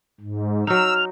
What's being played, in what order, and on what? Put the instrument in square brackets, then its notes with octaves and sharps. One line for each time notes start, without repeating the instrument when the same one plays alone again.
[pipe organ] G#2
[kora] F#3 D#4 [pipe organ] E6 [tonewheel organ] F6